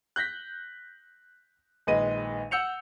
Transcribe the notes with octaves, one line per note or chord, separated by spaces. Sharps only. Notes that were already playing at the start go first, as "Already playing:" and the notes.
F#6 G6 A#6 B6
A#1 D#3 G#3 B4 D#5 D#7
F#5 E6 G6 C#7 F7